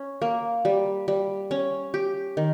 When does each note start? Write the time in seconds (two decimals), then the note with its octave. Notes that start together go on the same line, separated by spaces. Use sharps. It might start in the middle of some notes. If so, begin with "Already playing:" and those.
Already playing: C#4
0.22 A#3
0.65 G3
1.08 G3
1.51 C#4
1.94 G4
2.37 D#3